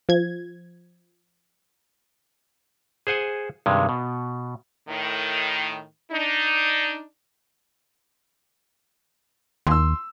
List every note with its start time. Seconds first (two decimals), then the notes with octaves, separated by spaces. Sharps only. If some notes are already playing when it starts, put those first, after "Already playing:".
0.09 F3 G#6
3.07 G#4 C5 F#5 G#5
3.66 G2 C3 D#3 G#3
3.89 B2
4.89 A2 D#3
6.12 D4 D#4
9.67 D#2 C6 E6